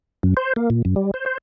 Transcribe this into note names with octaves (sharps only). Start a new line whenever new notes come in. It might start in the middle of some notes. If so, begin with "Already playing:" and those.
F#2
C5
A#3
A#2
F#2
G3
C5
C5